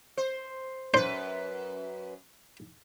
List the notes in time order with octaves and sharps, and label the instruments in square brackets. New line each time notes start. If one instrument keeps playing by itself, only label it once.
[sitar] C5
[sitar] F#2 B4 [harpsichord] C5